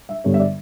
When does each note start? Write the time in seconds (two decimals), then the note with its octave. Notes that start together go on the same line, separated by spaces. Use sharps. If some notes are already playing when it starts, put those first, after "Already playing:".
0.09 E5
0.24 G2 D3 G3 B3 C#5
0.34 E5
0.39 D5